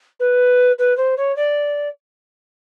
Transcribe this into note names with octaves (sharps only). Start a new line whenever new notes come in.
B4
B4
C5
C#5
D5